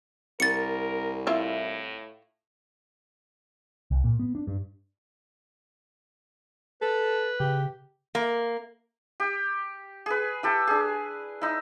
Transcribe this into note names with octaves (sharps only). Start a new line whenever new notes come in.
C2 A#4 A6 C#7
A2 E4 F4 E5
C2
A#2
B3
D4
G2
A4 B4
C#3 G4
A#3
G4
G#4 B4
E4 G4 A4
D4 G#4
D#4 E4